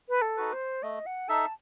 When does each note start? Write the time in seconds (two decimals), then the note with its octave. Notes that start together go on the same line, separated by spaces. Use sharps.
0.09 B4
0.22 A4
0.37 D#4 F#4 B4
0.53 C5
0.83 A3 D#5
1.06 F#5
1.29 D#4 A4 E5 A5